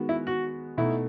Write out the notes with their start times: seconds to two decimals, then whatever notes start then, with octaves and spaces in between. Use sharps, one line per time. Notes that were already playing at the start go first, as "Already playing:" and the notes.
Already playing: D#3 G#3 B3 F#4
0.09 E4
0.27 F#4
0.78 B2 A3 D#4 E4